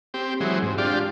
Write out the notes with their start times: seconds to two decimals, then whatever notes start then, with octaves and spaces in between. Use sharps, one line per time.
0.14 C4 G4
0.40 E3 F#3 G#3 C4
0.62 G#2
0.78 D4 F4 G4